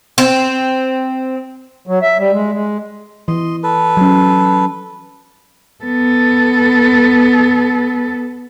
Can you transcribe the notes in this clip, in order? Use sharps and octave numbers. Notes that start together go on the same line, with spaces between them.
C4
F#3
E5
G3
G#3
G#3
E3 D#5 C6
A4 B4
F#3 C#4
B3 A4